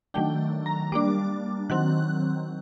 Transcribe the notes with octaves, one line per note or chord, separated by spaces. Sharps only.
D#3 F#3 A3 D4 G5
A#5
G3 A#3 D4 D6
D#3 F#3 C4 F#6